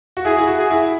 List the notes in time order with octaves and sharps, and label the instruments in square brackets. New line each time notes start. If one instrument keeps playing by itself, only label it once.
[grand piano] F#4
[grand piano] E4 [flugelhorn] G#4
[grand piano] E4
F#4
[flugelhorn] G#4
[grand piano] E4